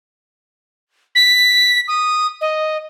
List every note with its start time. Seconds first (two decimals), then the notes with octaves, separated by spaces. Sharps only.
1.15 B6
1.88 D#6
2.41 D#5